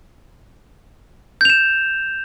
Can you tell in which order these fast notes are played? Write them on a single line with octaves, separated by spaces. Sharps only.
G6 F7 E7